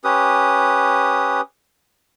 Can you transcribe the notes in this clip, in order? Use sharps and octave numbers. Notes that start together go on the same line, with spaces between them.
C#4 G4 B4 D#6